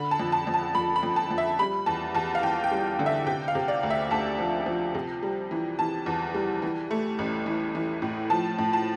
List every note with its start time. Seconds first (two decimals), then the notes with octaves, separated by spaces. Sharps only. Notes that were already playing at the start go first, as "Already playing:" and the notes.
Already playing: D3 B5
0.11 A5
0.20 F2
0.32 A5
0.47 F2
0.54 A5
0.75 F2 B5
0.96 B5
1.03 F2
1.16 A5
1.31 F2
1.38 E5
1.59 G3 B5
1.86 E2 A5
2.15 E2 A5
2.35 F5
2.43 E2 G5
2.64 G5
2.71 G3
2.99 D3
3.06 E5
3.26 C3 G5
3.48 F5
3.55 C3
3.68 D5
3.83 D2
3.90 E5
4.11 D2 A5
4.39 F3
4.66 F3
4.95 C3
5.23 G3
5.51 E3
5.79 E3 A5
6.06 E2
6.34 G3
6.62 E3
6.91 A3
7.19 A1
7.46 E3
7.75 E3
8.02 A2
8.30 F3 A5
8.58 A2
8.73 A5